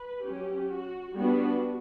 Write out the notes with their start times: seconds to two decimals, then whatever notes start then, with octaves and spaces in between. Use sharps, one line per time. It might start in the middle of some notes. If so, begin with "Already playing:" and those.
Already playing: B4
0.24 F#3 C#4 G4
0.70 F#4
1.14 G3 B3 D4 F#4